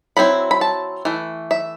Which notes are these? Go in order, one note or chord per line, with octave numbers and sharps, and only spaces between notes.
F#3 C4 E4 B5
B5
A5
E3 A3
E5